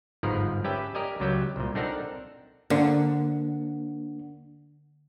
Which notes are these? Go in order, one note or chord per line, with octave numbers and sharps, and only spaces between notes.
G1 G#2 D#3 F3 A#4 B4
C#4 G4 B4 E5 G5 A5
G4 A#4 D5 D#5 G#5
C#2 F#3 G4 G5
C2 A#2
C4 D4 D#4 A4 A#4 F#5
D3 A#3 D4 F#5